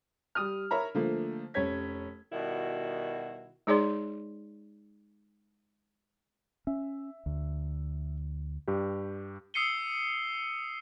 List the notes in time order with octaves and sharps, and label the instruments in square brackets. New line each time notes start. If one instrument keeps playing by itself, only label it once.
[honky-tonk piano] G3 D#6 F6
A#4 C#5 E5 A#5 B5
D3 F3 A3 A#3
F1 C#4 C#5 G#6 B6
[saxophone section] B2 D#3 G3 E4 F#4
[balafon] G#3 D#4 G#4 C#5 D5 C6
[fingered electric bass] C#4 [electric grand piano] E5
[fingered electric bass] D2
[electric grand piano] G2 G4
[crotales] D#6 E6 C7 C#7 D#7 G7